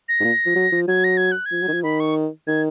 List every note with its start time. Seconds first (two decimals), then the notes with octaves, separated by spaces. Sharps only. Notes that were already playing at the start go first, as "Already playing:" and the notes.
0.09 A#6
0.20 G#2
0.24 A#2
0.46 F3
0.56 F#3
0.72 F3
0.88 F#3 G#6
1.04 A#6
1.17 G#6
1.32 F#6
1.46 G#6
1.52 F3
1.62 F#3
1.68 D#3
1.73 F3
1.83 D#3 B5
2.00 C#6
2.47 D#3 G#6